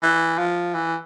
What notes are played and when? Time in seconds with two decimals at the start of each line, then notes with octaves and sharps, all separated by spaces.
0.03 E3
0.38 F3
0.75 E3